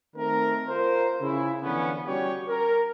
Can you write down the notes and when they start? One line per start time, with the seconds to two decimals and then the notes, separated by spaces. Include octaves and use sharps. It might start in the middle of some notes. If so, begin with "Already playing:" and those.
0.16 D#3 A3 C4 A#4
0.67 F4 A#4 C5
1.21 C#3 E4
1.63 D3 E3 F3 B3 C#4
2.06 G3 C#4 F#4 G4 C#5
2.48 A#4